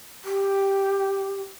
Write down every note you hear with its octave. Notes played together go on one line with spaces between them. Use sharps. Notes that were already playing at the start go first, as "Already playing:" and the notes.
G4